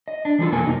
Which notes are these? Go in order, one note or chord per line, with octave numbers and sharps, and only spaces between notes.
D#5
D4
E3 G3 F4 A4
F2 B2 A#3 A4 G#5
F#2 C3 D#4